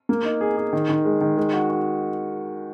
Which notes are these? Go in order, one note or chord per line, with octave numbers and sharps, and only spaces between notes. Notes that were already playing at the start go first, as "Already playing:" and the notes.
A#3
D#4
G#4
G#4
D#3
D#3
G#3
D#3
G#3
F#4
F#4